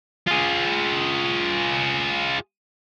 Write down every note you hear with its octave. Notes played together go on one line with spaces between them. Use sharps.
F4 G#4